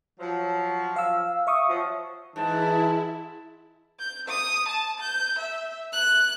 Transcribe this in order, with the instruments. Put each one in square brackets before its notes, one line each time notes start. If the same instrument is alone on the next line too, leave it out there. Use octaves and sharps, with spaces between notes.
[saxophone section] F3 F#3
[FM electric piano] F5 E6
E5 C#6 D#6
[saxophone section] F3 F#3
[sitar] G#2 [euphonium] E3 [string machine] E4 [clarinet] A5
[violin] G6
D#6
A5
G6
E5
F#6